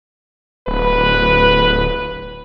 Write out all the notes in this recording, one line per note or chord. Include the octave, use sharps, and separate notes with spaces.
D1 B4